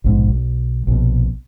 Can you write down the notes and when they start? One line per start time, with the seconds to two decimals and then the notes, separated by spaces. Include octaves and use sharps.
0.04 A#1 G#2 B2
0.29 B1
0.87 A#1 B2